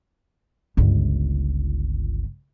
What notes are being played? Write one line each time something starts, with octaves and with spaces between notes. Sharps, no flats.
G1 C#2